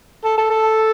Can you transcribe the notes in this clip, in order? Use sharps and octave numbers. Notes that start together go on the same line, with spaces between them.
A4
A4
A4